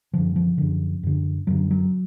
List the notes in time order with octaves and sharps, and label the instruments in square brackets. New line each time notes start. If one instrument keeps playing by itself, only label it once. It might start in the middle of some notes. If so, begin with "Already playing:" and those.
[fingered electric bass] F#2 D3 F3
F3
F#2 D3
F#2 D3
F#2 D3 F#3
F#3